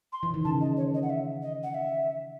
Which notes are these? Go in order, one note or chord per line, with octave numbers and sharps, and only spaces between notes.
C6
E3
D#3
C#3 A5
D#5
C#5
D#5
F#5
E5
D#5
F#5
E5